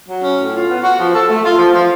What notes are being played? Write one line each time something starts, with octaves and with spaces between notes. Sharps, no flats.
F#3
C#4
A2
F4
B3
F#4
F3
A4
A3
F4
F3
F3